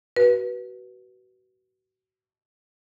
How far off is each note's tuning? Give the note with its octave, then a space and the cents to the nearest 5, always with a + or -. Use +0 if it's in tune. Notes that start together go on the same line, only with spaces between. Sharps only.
F#4 +30 B4 -15